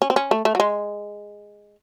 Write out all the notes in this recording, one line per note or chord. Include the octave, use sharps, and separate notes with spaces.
C#4
C4
C#4
A3
A3
F#3
G#3